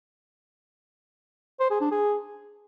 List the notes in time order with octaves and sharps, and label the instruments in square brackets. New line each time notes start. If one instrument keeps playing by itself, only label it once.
[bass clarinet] C5
G#4
D4
G#4